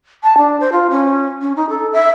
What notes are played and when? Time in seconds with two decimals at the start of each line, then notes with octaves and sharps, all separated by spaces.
0.23 A5
0.38 D4
0.60 C5
0.72 F4
0.90 C#4
1.41 C#4
1.56 D#4
1.69 A4
1.93 E5